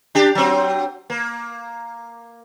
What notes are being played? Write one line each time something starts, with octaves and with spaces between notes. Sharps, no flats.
D4 G4
F#3 C4
A#3